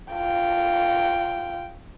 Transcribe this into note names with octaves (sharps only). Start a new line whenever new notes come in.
F4 G5